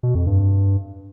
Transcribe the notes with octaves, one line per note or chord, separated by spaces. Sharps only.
B2
F2
G2